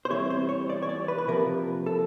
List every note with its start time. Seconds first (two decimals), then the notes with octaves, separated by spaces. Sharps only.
0.05 C5
0.11 E3 G3 C4 C#5
0.30 C5
0.49 C#5
0.70 D5
0.83 C#5
0.89 D5
1.08 B4
1.18 B4
1.27 C3 F3 A#3 A#4
1.86 A4